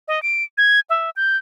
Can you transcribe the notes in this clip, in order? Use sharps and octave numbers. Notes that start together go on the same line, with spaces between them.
D#5
D7
G#6
E5
G6